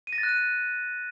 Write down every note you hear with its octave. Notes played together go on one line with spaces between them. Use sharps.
D#7
A#6
A6
F#6
D#7